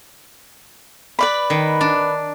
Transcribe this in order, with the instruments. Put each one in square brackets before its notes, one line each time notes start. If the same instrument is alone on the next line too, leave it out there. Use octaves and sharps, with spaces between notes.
[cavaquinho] B4 D5 B5
[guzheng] D#3
D4